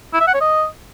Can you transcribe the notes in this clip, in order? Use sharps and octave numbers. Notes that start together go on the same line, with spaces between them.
E4
E5
F#5
C#5
D#5